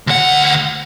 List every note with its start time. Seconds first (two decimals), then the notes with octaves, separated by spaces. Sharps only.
0.07 D2 F#5